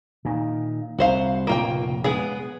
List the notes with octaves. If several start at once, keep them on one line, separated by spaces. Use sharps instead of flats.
A#2 D#3
C2 F#4 C5 F5
F1 A#2 C#3 A#3 F4 G5
G#3 B3 G#4